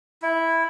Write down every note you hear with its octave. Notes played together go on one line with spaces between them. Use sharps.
E4